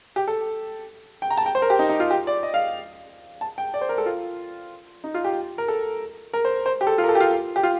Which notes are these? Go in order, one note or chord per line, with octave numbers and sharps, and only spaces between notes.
G4
A4
G5
A#5
A5
G5
C5
A#4
G4
D#4
D#4
F4
G4
D5
D#5
F5
A5
G5
D5
C5
A#4
A4
F4
D#4
F4
G4
A#4
A4
A#4
C5
C5
G4
A4
F4
A#4
A4
G4
F4
G4
F4